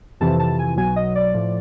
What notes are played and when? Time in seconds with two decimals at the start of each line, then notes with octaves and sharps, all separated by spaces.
0.20 F2 C3 E3 A5
0.40 A5
0.59 G#5
0.77 B1 B2 F#3 G#5
0.96 D#5
1.15 D5
1.34 A2 F3